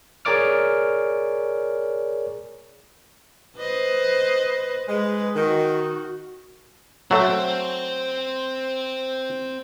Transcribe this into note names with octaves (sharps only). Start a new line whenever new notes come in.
G#4 A#4 C#5 D5 D6 F6
B4 C5 D#5
G#3 B4
D#3 F#4
F#3 A3 C4 C5